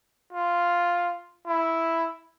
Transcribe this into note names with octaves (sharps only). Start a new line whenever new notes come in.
F4
E4